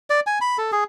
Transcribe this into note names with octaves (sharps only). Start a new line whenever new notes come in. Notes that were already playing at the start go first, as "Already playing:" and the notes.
D5
G#5
B5
A4
G#4